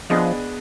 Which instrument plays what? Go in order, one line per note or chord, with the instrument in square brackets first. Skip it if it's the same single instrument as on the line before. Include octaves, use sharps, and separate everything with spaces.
[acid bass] F3 [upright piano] B3 D4 G#4 D#5